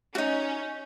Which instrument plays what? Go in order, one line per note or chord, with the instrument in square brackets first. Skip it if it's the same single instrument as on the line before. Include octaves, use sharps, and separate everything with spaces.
[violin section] C#4 [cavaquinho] D#4 F#4